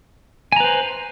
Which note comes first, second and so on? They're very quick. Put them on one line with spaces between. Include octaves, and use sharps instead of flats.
G#5 A#5 B4 C5